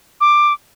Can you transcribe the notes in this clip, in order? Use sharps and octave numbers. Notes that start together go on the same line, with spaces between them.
D6